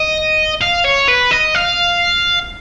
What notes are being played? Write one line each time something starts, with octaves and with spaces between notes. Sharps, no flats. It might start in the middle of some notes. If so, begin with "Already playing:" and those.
Already playing: D#5
F5
C#5
B4
D#5
F5